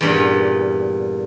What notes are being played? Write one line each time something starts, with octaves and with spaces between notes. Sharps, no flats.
E2 G2 A#2